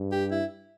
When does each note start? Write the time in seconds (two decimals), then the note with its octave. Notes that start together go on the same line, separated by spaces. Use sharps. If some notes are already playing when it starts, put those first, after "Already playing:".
Already playing: G2
0.12 G4
0.31 E4